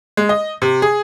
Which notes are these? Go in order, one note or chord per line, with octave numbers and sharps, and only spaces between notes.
G#3
D#5
C3
G#4